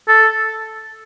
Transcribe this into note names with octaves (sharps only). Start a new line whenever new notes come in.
A4